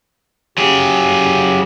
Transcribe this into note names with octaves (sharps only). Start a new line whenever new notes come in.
C#3 F#3 G4 G#4